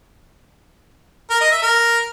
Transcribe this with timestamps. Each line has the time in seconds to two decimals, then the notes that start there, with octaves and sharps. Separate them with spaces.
1.30 A#4
1.41 D#5
1.51 E5
1.62 A#4